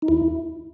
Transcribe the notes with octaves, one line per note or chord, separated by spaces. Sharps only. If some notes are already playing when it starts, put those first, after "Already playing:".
D#4
D#2 E4